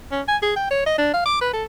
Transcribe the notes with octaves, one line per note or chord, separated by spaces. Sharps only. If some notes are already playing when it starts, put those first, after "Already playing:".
C#4
G#5
G#4
G5
C#5
D#5
D4
F5
D6
B4
A4